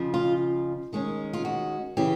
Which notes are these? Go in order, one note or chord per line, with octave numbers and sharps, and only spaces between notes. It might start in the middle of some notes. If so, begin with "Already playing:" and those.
Already playing: F2 C#3 F3
F4
D#3 G#3 C#4
F4
F#4
C#3 E3 G4